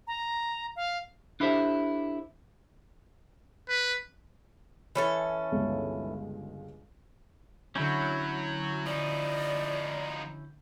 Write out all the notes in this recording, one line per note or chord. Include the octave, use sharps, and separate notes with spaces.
A#5
F5
D4 E4 G4 A4 C5 E5
B4
E3 C#4 A4
G1 C#2
D3 F#3 C#4 E4 F#4 G6
F3 D#4 D5